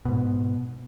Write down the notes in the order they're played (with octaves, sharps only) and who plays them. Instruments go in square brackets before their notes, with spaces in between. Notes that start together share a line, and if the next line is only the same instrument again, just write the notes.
[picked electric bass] G#2 B2